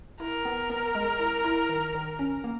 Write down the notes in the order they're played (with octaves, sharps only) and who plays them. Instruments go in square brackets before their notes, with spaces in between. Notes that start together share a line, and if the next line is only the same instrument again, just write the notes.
[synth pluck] E4 [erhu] A#4
[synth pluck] B3
B3
G#3
E4
E4
D#3
D#3
C#4
A#3